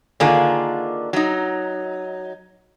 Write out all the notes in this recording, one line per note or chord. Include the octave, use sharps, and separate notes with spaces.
D3 D#3 A#3 D4 F4 G#4
F#3 D#4